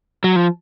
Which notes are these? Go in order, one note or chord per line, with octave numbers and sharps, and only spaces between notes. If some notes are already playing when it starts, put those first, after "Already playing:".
F#3
F3